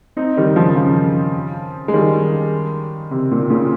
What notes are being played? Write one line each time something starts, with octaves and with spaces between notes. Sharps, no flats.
C4 D#4
D#3 G3
C#3 F3
C#3 F3
G#3
D#3 G3
C3
A#2
A#2 C#3